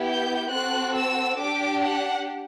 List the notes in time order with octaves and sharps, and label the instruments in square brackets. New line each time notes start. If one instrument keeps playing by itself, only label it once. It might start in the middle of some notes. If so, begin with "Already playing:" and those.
Already playing: [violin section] B3 E4 G4
G6
C4 F#4 A4 F#6
E6
D4 G4 D6
F#5